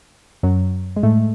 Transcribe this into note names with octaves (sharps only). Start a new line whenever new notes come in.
F#2 F#3
G#3
A2 A3